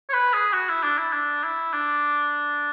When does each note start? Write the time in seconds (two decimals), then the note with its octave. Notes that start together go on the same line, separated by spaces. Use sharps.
0.10 C#5
0.13 B4
0.34 G#4
0.53 F#4
0.69 E4
0.83 D4
0.98 E4
1.13 D4
1.44 E4
1.73 D4